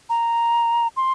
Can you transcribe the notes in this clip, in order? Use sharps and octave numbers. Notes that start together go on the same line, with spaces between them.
A#5
C6